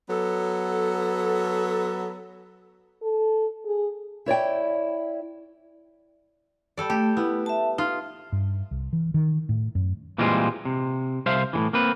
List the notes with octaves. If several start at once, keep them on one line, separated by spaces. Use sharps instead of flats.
F#3 B3 A4
A4
G#4
E4 C#5 D5 G5
G3 A4 D5
A3 G4
B3 E4
E5 A5
D#4 F4
G2
C2
E3
D#3
A2
F#2
A#2 E3 G3 G#3 C4 F4
C3
C2 C5 E5 F5
A2 C#3 E3
A#3 C4 B4